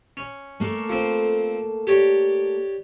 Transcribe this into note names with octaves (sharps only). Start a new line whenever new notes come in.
C#4
A3 A#3 A4
F3 C4
G4 C#5 D5